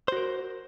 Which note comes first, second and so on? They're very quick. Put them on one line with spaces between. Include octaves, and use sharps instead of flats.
C5 F#4 A#4